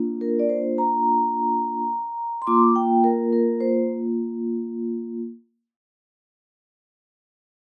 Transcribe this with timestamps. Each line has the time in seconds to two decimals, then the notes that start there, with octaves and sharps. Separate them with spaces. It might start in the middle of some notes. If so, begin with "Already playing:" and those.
Already playing: A#3 D4 F4
0.21 A#4
0.40 D5
0.49 C5
0.78 A#5
2.42 C6
2.47 A#3 F4 D6
2.76 G5
3.04 A#4
3.33 A#4
3.60 C5